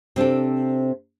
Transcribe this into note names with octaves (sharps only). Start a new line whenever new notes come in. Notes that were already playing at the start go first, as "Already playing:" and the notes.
C3 C4 D4 A4